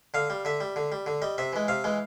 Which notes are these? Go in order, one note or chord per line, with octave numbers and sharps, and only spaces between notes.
D3 F5
G3
D3 E5
G3
D3
G3
D3
G3 D#5
C3 E5
E3 G#3
C3 F5
E3 G#3